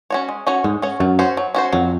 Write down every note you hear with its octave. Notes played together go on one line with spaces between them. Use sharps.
C#4 F#4 C#5
G#3
C#4 F#4 C#5
G#2 G#3
C#4 F#4 C#5
F#2 F#3
C#4 F#4 C5
F#3
C#4 F#4 C5
F2 F#3